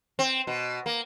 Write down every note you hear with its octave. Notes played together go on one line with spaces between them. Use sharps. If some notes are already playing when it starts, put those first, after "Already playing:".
C4
B2
A#3